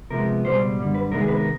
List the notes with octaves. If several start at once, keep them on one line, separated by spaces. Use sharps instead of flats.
C3 F3 G#3 B3 A#4
C#2 B2 G3 C5
F#2 D3 G3
B4
C3 D#3 G#3 B3 A#4
G#4
B4
A#4